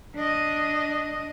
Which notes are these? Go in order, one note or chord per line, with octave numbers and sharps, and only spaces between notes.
D4 D#5